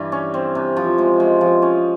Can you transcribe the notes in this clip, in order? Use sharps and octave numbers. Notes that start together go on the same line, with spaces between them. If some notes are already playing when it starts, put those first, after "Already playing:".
Already playing: G2 E3
C#4
C4
C3
F3
G#3
G#3
F3
C#4